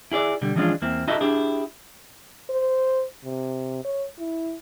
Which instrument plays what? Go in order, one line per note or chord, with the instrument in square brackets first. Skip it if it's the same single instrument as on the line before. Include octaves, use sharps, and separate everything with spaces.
[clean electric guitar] E4 G#4 C#5 D5
B2 D3 G3
E3 F3 G#3 C#4 D4 F4
E2 A#3 C4 E4
D#4 E4 F#4 A4 D#5 E5
D4 E4 G4 G#4
[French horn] C5
C3
C#5
E4